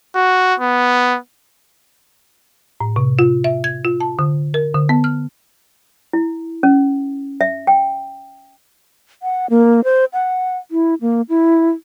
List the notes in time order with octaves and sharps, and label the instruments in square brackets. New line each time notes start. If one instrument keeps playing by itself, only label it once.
[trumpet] F#4
B3
[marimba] A2
C3
F4
E5
G#6
F4
A5
D3
A#4
D3
B3
F6
[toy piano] E4
C#4
E5
G5
[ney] F#5
A#3
C5
F#5
E4
A#3
E4